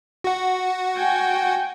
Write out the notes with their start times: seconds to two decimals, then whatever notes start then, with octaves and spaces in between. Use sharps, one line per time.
0.24 F#4 F#5
0.97 G5 G#5